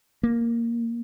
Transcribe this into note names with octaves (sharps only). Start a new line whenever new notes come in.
A#3